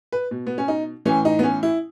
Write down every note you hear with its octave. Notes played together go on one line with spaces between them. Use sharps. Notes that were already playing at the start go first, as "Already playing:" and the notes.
B4
B2
B3
C#4
D#4
A2 E3 C#4
D#4
B3
C#4
E4